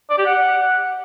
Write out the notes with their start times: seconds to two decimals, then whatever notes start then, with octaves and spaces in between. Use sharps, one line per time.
0.10 D5
0.18 G4
0.26 F#5